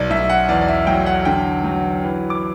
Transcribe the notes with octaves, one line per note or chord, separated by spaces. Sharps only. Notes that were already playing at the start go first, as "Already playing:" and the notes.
Already playing: B1 D5
B1 E5
F#5
E2 D5
D5
E5
F#3 G5
F#5
D3 G5
F#3
E3
D6